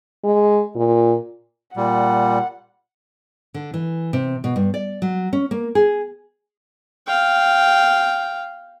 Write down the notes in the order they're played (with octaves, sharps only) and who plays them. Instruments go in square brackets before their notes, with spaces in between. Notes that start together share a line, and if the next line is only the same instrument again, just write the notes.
[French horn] G#3
A#2
[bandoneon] A#2 G3 [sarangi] F#5
[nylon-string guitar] D3
E3
C3
B2
G2
D5
F#3
C#4
A#3
G#4
[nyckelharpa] F5 G5